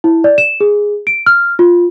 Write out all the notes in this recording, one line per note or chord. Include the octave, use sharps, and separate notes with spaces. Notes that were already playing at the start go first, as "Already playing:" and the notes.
E4
D5
E7
G#4
D7
F6
F4